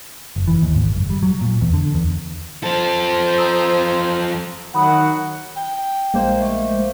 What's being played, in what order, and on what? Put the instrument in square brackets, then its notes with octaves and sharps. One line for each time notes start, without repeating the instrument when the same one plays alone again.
[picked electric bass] F#1
E3
D#2
G#1
F#1
G3
F#3
A#2
E2
D3
E2
[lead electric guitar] F3 A4 [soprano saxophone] C5
[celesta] A#5 D#6 E6
[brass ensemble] D#3 F#3 F#5 [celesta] B5 D#6
[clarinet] G5
[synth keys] A#1 A#3 C5 [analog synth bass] G#3
[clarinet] A3